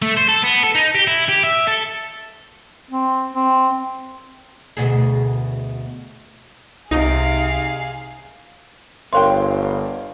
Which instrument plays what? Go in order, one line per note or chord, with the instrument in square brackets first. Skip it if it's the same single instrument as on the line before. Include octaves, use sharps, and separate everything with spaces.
[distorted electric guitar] A3
C5
A4
B3
A4
D#4
G4
E4
G4
E5
A4
[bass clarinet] C4
C4
[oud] D2 B2 G#4
[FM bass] C2 [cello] C3 [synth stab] D#4 [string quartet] G#4 F5
[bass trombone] G1 [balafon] A#4 C6 [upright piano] C#5 F5 G5